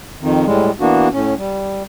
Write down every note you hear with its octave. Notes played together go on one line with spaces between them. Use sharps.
F2 D#3
A2 G3 G#3
E3 A#3 B3 D4 F#4
A2 C#4
G3